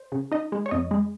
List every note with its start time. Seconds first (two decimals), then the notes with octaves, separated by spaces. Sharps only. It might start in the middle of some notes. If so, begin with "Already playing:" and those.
Already playing: C5
0.12 C#3
0.32 D#4 D#5
0.52 G#3
0.66 C#5
0.71 F2 D#5
0.91 G#3